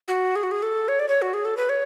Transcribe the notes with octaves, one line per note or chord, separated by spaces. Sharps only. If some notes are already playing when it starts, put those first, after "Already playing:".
F#4
G#4
F#4
G#4
A4
C#5
D5
C#5
F#4
G#4
A4
B4
C#5